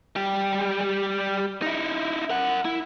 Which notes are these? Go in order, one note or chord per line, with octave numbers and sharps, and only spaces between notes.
G3 G4
D#4 E4
A#4 F#5
E4